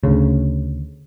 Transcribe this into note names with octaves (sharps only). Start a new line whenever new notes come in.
D2 C#3